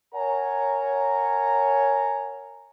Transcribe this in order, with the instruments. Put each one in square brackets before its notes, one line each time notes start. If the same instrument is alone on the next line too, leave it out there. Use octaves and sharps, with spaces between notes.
[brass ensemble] A#4 C#5 F#5 G#5 A#5